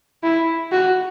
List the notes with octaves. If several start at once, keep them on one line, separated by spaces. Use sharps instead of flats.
E4
F#4